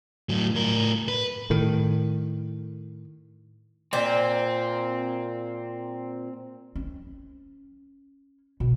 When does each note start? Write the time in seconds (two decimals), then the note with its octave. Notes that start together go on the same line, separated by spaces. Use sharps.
0.29 A2 F#3
0.55 A2 A#4
1.08 B4
1.50 A2 D#3
3.93 A#2 A#3 C4 C5
6.75 C#4
8.60 B2